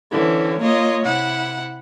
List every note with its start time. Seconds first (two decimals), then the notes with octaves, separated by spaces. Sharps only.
0.11 D3 E3 C4 C#4
0.61 A#3 F4 C#5 D#5
1.05 C3 E4 F#5